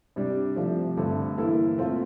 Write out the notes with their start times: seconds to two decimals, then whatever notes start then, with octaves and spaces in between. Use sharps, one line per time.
0.16 C3 G3 D4
0.56 C3 F3 A3
0.97 G2 D3 A3 C4
1.38 E3 A#3 E4 A4
1.78 A#2 A3 C4 F4